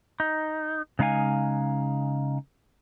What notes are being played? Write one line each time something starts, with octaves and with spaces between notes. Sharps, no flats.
D#4
C#3 G#3 D#4 F5 G#5